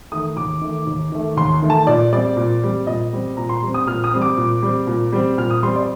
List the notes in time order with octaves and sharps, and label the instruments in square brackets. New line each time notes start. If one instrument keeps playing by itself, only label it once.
[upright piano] D#3 A3 D#6
D#2 D6
D#3 A3
D#2
D#3 A3
D#2 C6
D#3 A3
A5
A#2 D5
G3 C4 D5
A#2
G3 C4
A#2 D#5
G3 C4
A#2 A#5
C6
G3 C4
D#6
A#2 F6
D#6
G3 C4
D6
A#2
G3 C4
A#2
G3 C4
A#2 F6
D#6
G3 C4 C6
D5